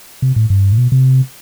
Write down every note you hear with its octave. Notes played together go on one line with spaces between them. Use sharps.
C3
A2
G2
A2
B2
C3